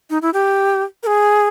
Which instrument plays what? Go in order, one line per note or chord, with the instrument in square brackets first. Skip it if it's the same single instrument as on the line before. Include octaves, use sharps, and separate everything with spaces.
[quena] D#4
E4
G4
A#4
G#4